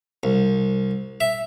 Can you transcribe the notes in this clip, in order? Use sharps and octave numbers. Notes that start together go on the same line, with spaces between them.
C2
E5